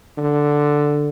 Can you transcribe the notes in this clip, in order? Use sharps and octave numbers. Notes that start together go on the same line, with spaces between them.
D3